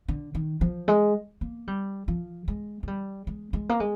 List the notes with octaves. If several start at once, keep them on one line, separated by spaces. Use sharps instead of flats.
D3
D#3
F3
G#3
A#3
G3
F3
G#3
G#3
G3
G#3
G#3
A#3
G#3